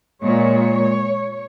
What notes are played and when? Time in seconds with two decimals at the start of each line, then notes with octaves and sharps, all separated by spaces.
0.23 A#2 G#3 C#5